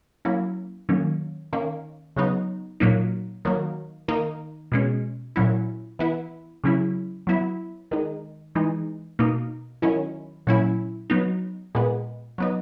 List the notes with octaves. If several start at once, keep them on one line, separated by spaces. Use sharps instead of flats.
F#3 A#3 C#4 E4
D#3 F#3 A#3 C#4
D#3 A#3 C#4
C#3 F#3 B3 D#4
A#2 F#3 A#3 D#4
D#3 F#3 A#3
D#3 A#3 D#4
B2 G#3 C#4
A#2 F#3 C#4 E4
E3 B3 E4
C#3 F#3 C#4 E4
F#3 B3 E4
D#3 G#3 D#4
E3 G#3 D#4
B2 A#3 D#4
D#3 F#3 C#4 E4
A#2 F#3 C#4 E4
F#3 B3 D#4
A#2 G#3 B3
F#3 B3 D#4